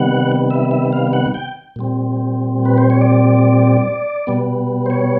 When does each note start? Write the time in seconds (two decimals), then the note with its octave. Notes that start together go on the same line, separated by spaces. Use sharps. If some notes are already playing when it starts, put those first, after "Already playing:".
Already playing: C3 D#3 G3 B3 F#5
0.50 E5
0.71 E5
0.93 F5
1.13 F#5
1.34 G5
1.76 A#2 G3 C4
2.65 B4
2.78 C5
2.90 C#5
3.01 D5
4.27 B2 G3 B3
4.86 C5
4.90 C#5